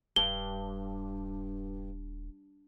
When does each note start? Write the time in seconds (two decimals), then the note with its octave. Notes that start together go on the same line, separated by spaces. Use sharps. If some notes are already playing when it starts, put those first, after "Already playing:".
0.16 D#1 G2 G7